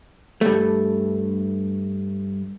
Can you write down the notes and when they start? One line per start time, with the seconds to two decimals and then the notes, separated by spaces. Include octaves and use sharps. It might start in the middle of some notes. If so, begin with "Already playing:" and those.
0.41 G2 A3